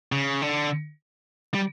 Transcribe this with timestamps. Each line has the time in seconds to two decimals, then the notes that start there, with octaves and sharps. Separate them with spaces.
0.12 C#3
0.42 D3
1.54 G3